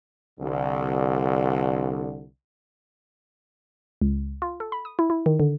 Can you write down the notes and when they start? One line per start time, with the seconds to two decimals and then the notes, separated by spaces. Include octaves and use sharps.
0.40 C2 D3
4.02 C#2
4.42 F4
4.60 A4
4.72 B5
4.85 D#6
4.99 E4
5.10 E4
5.26 D#3
5.40 D3